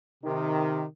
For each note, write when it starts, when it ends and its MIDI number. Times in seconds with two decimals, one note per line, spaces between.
0.23 0.83 48
0.23 0.85 51